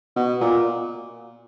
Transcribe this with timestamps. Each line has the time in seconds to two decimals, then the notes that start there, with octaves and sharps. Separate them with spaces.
0.16 B2
0.41 A#2